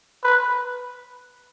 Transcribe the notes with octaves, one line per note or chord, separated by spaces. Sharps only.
B4